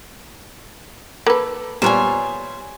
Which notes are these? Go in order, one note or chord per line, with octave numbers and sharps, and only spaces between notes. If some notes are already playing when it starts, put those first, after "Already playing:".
A#3 A4 B4
A#2 G3 B3 C5 C#5 G#5